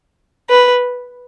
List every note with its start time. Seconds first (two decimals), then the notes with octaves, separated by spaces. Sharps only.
0.50 B4